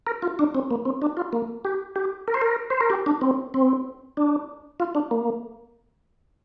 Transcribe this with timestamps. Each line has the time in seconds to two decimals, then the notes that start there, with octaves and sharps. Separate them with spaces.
0.07 A#4
0.22 F4
0.39 D4
0.55 C4
0.71 A#3
0.85 C4
1.02 D4
1.17 F4
1.33 A#3
1.65 G4
1.96 G4
2.28 A#4
2.34 C5
2.42 A#4
2.70 C5
2.81 A#4
2.90 G4
3.06 D4
3.21 C4
3.54 C4
4.17 D4
4.80 F4
4.95 D4
5.11 A#3